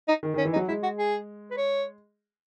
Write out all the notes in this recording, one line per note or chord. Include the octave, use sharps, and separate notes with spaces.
D#4
D#3
D#3
C#4
E3
D#4
F#3
G#3 E4
F#4
G#4
B4
C#5